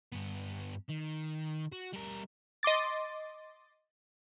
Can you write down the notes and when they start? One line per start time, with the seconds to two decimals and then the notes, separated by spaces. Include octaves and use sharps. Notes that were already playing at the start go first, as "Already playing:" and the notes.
0.12 G2 B3
0.89 D#3
1.72 F#4
1.93 G3 A#4
2.63 D#5 C6 D6 A6